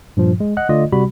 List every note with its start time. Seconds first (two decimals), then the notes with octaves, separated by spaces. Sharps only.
0.17 G2 A#2 F3
0.40 G#3
0.57 D#5 F#5 F#6
0.69 D3 A3 F4 D5 D#5
0.93 C3 G3 F#4 B5